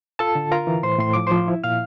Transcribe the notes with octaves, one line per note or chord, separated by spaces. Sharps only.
F4 A4 A5
D3
F4 A#4 A#5
E3
A2 C5 C6
A2 C6
F3 D6
F3 C5 C6
E4
A#2 F5 F6